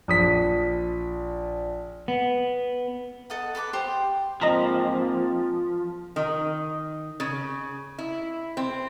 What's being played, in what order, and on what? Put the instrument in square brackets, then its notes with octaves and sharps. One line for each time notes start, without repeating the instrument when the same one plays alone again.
[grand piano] A#1 D#6 B6
[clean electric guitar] B3
[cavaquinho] A4 D#5 F#5
A4 B4 C6 D6
G4 C5 C6
[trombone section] G#2 A#3 C4 [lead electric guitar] F3 [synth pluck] D#5 A#5 B5
[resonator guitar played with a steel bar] D#3
C#3
E4
C4